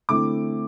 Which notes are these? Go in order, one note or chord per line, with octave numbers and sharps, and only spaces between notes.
D3 A3 C4 E4 D6